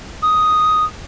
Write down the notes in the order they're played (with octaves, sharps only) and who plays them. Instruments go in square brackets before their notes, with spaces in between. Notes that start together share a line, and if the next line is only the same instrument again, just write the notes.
[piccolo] D#6